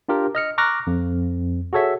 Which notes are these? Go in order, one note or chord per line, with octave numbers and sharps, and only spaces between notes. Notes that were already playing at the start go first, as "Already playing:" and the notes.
D4 F4 G4 A#4
D#5 F6 C#7
A#5 C#6 D6 F6 F#6 A#6
F2
F#4 G#4 A4 C#5 E5